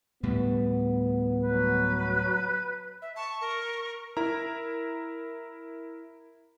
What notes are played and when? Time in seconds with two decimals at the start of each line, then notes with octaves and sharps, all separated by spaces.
0.23 D2 A2 G3 B3
1.43 F#3 B4
3.02 E5
3.16 A5 C#6
3.41 A#4
4.17 E4 A#4 A#5